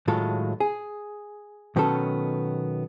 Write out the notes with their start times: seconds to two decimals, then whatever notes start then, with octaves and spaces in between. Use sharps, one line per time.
0.08 A2 D#3 F#3 G#3 F4 A4
0.60 G#4
1.76 B2 D#3 F#3 B3 C#4 A4